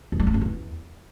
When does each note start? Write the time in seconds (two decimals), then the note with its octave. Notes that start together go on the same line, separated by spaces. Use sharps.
0.12 E2
0.20 G3
0.27 A3
0.34 F2
0.41 E2